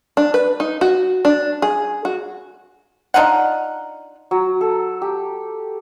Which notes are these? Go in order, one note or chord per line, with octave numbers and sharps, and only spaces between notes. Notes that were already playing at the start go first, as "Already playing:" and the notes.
D4
B4
D#4
F#4
D4
G#4
F#4
D4 D#4 F4 F#5
F#3
A4
G4